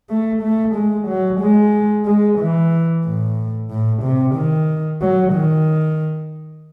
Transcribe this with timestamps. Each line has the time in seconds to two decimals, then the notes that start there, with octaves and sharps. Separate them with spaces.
0.09 A3
0.42 A3
0.75 G#3
1.08 F#3
1.41 G#3
2.06 G#3
2.39 E3
3.04 A2
3.70 A2
4.03 C3
4.35 D#3
5.01 F#3
5.33 D#3